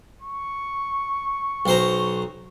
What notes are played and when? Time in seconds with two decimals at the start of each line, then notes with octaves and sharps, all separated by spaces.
0.22 C#6
1.66 B1 C5 A#5